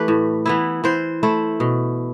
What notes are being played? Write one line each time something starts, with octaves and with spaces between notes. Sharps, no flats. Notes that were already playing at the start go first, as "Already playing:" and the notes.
Already playing: E3 A3 G4 B4
A2
E3 B3 E4
E3 C5
A3 E4
B2